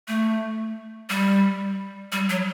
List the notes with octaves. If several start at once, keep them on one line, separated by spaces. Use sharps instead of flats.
A3
G3
G3
F#3